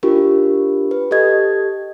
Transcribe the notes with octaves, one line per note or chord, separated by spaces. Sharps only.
D4 F4 G4 A#4
B4
G4 A4 D#5 G#6